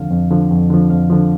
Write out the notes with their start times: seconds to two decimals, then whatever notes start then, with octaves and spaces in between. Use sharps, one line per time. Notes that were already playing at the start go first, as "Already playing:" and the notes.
Already playing: F2 D3 F3 F5
0.11 F2
0.31 D3 F3
0.51 F2
0.70 D3 F3
0.90 F2 F5
1.10 D3 F3